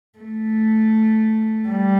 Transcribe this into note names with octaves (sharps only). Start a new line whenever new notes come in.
A3
G3